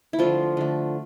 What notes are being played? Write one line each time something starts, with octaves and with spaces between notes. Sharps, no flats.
E4
D3 F3 A3 F4
D3 A3